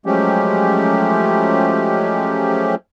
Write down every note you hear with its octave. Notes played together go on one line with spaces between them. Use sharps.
F3 F#3 G#3 A3 C#4 G4